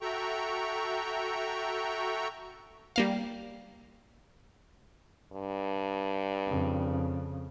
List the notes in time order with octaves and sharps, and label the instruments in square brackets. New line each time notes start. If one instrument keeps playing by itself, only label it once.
[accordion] F#4 A4 E5 G5 A#5 C#6
[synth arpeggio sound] G3 A#3 F5
[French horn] G2
[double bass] F2 C#3